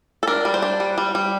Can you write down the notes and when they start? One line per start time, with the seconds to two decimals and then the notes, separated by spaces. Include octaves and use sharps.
0.23 A4
0.27 D4 A#4
0.45 G3
0.54 C5
0.62 D4
0.80 G3
0.98 G3
1.15 G3